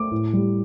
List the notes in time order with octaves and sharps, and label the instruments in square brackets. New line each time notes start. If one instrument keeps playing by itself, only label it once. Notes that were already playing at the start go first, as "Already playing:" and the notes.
Already playing: [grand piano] A3 D6
A2
G3